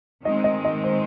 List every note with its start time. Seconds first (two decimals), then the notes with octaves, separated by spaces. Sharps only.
0.24 D#3 G#3 C4 D#5
0.44 D#5
0.65 D#5
0.84 C5